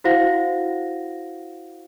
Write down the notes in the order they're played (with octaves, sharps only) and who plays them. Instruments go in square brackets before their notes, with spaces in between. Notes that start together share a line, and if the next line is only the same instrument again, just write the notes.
[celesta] E4 F#4 C5 F5 F#5 A#6